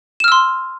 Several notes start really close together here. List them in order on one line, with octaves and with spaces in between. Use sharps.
E7 F6 E6 C6